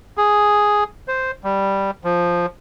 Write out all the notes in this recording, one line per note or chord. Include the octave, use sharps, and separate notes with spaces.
G#4
C5
G3
F3